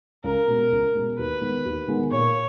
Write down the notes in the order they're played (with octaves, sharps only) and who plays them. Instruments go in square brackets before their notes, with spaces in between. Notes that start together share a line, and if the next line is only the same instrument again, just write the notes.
[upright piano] C#2 [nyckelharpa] A#4
[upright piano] B2 G#3
C#2
B2 G#3
[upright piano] D#2 [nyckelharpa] B4
[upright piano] D#3 G#3 B3
D#2
D#3 G#3 B3
[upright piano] A#2 [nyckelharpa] C#5